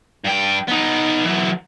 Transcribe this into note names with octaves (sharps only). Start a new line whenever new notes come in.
G2 G5
B3 D#4
E3 F#3